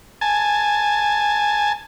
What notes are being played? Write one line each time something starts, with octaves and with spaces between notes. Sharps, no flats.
G#5 A5